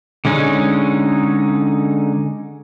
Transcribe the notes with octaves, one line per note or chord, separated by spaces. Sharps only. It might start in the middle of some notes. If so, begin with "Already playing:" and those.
D3 G#3 C#4 D#4